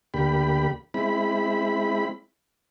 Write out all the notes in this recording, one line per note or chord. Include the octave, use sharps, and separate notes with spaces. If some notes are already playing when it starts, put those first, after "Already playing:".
D2 A#3 G4 B5
G#3 C4 E4 B5